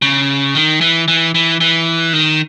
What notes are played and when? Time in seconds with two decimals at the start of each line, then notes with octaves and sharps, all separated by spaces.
0.02 C#3
0.55 D#3
0.81 E3
1.08 E3
1.35 E3
1.61 E3
2.13 D#3